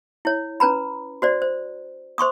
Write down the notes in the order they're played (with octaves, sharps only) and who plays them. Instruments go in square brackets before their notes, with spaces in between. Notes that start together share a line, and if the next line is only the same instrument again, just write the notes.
[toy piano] E4 C#5
C#4 B4 A#5 B5
F#4 C5 D5
C5
C5 C6 C#6 D#6